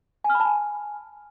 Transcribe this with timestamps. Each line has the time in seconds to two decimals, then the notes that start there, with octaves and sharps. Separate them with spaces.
0.24 G#5
0.30 F6
0.35 B5
0.40 A5
0.45 G#5